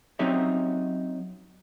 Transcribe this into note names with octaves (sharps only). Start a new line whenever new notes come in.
F#3 C4 C#4 D#4 G4 E5